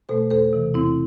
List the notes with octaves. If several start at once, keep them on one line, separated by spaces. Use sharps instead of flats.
B2 A3 A4 C5
E2 A4 C5
C3 E3
E2 C4 E4